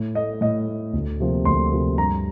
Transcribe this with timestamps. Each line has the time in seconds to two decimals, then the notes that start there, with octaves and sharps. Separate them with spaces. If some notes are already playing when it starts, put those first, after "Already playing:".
Already playing: A2
0.15 A3 D#5
0.41 A2 D#5
0.67 A3
0.93 D2
1.20 C3 F3 A#3
1.45 D2 C6
1.72 C3 F3 A#3
1.98 G2 A#5